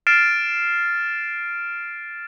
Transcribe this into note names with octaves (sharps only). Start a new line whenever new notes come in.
F6 A6 C7 D7 E7